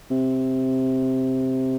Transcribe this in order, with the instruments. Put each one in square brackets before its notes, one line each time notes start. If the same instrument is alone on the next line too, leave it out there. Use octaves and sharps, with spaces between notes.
[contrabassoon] C3